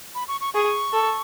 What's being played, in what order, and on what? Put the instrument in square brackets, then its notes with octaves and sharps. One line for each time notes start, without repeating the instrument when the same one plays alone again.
[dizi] B5
C#6
C#6
[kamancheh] G#4 [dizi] C#6
[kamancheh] A4